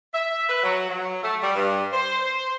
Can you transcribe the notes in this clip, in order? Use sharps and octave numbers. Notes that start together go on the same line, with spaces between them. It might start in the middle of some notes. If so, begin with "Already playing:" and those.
E5
B4
F#3
F#3
A3
G3
G2
C5